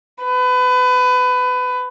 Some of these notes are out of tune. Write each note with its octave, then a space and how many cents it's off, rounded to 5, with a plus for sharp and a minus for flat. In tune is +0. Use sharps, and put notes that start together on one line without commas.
B4 +25